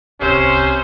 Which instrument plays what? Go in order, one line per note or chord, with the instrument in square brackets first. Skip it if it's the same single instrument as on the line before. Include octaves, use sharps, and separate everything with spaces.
[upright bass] D1 C2 [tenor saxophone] C3 [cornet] C#4 [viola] C5